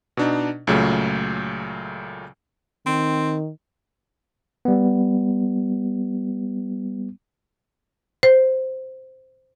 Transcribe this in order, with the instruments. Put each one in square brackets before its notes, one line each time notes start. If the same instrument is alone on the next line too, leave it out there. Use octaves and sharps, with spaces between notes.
[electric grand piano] B2 D4 D#4
C#2 A#2 C#3 F#3 A3
[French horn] D#3 [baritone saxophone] C4
[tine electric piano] G3 B3
[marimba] C5